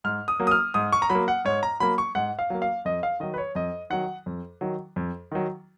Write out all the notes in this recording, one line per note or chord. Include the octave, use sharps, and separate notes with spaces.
G#2 F6
D#6
F#3 A#3
D#6
F6
G#2 D#6
C#6
A#5
F#3 B5
A#3
F#5
G#2 C#5
A#5
F#3 A#3 B5
C#6
G#2 F#5
F5
F#3 A#3
F5
F2 D#5
F5
D#3 F#3 D#5
B4
C#5
F2 D#5
D#3 F#3 F#5
F2
D#3 F#3
F2
D#3 F#3